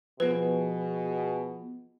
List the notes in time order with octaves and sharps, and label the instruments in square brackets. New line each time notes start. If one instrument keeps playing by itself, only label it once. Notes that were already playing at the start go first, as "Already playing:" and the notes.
[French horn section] B2 G#4 [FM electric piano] F3 B3 [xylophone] B4